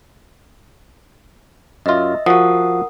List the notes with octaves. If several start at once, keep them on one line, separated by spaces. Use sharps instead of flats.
F#2 F4 D#5 E5
F3 F#4 A#4 F#5 D#6